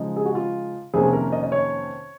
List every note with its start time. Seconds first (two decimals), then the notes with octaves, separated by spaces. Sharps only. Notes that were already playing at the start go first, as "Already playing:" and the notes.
Already playing: C#3 F3 G#3 D#4
0.16 G#4
0.26 F#4
0.35 F4
0.94 F2 C3 D#3 A#3 C#4 G#4
1.13 A#4
1.32 D#5
1.43 D#5
1.52 C#5